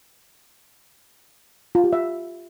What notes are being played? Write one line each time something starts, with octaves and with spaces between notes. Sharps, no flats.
F4
G4
E5